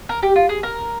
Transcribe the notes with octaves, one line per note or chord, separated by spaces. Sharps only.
A#4
G4
F4
G#4
A#4